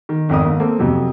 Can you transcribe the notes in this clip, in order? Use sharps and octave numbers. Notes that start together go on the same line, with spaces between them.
D#3
G#1 F2 A#4 D#6
G#1 D#2
A#3 C4 A4
F2 C3 F#3